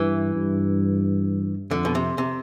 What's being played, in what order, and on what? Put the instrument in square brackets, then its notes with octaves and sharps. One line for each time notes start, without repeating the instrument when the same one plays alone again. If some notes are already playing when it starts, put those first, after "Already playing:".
Already playing: [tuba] G2 [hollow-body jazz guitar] E3
[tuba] G2
[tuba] F2 [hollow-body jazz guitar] D3
[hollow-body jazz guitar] B2
C3
C3